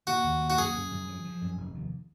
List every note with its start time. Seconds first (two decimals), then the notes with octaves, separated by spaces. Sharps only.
0.07 A#3 F#4
0.24 D#2
0.42 A#3
0.50 F#4
0.58 F#2 G#4
0.74 F#2
0.91 F#2
1.08 F3
1.24 F3
1.41 F#2
1.57 F1
1.74 D#2